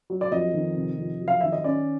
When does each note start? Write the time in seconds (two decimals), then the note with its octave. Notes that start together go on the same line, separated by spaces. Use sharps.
0.10 F#3
0.21 D5
0.32 F2 D#5
0.54 D#3
0.76 C3
0.98 F2
1.20 F#3
1.28 F5
1.41 D#3 E5
1.52 D#5
1.64 C#4 D5